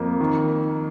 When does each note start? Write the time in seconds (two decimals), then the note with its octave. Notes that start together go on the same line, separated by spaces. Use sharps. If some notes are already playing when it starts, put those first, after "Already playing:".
Already playing: F2 A#3
0.21 D#3